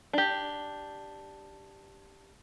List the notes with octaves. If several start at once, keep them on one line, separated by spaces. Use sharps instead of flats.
D4 G4